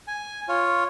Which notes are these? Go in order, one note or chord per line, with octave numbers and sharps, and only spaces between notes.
G#5
F4 C#5